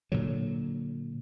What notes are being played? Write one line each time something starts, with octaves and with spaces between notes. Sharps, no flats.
A#2 D3 F#3